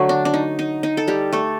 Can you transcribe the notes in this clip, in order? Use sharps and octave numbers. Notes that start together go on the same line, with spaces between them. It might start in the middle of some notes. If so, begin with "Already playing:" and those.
Already playing: D3 F#3 A3 F#4
D4
D4
D#4
D#4
D#4
A4
G3 G4
A3 A4